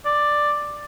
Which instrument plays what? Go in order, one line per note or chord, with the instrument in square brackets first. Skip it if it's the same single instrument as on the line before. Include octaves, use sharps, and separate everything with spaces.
[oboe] D5